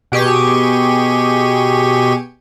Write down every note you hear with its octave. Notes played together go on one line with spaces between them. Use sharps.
B2 G4 G#4 C#6 D#7